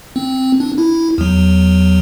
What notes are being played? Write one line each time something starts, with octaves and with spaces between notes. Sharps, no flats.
C4
D4
E4
E2 F#3